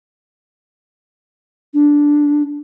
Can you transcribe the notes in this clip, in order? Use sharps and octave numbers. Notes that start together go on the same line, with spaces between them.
D4